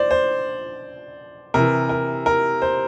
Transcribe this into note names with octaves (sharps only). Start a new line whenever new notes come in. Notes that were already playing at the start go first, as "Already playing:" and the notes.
Already playing: C5 D5
C5
C3 E3 A#4
A#4
A#4
C5